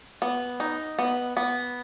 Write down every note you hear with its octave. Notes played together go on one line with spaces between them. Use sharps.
B3
D#4
B3
B3